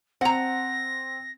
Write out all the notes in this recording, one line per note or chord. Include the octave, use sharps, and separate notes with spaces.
C4 F#5 A#5 A#6